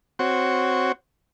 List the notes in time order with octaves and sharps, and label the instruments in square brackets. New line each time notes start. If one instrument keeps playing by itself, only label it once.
[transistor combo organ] C4 F#4 C#5